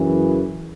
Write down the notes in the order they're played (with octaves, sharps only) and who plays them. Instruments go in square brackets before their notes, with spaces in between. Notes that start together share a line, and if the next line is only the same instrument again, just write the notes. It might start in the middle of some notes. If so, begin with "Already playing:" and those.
Already playing: [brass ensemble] F#2 C#3 E3